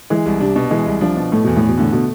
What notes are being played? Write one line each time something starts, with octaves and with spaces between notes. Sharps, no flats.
E3 G#3
C2
C3 D4
B2
E3 G#3
C2
F3 D4
B2
A2 A3
E2 B2
A2
E2
B2
A2 D3
B2 A3